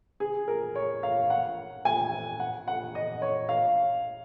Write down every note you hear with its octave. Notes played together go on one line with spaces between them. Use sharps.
G#4
A#4
C#5
F5
F#5
G#5
F#5
F#5
D#5
C#5
F5